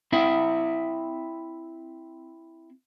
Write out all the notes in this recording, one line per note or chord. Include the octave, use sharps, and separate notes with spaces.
C4 E4 E5